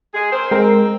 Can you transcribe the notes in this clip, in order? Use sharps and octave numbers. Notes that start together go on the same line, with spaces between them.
G#3 G#4
C4 A#4 C5
G#3 C4 A#4